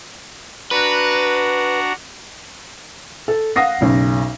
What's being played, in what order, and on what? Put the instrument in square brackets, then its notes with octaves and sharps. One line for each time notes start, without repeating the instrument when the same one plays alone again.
[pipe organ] D4 F#4 A#5 [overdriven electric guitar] B4
[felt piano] A4
F5 F#5 D#6 A#6 C7
F#1 B1